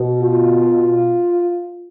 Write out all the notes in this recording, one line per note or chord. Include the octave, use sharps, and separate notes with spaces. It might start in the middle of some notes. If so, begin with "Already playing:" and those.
Already playing: B2
F4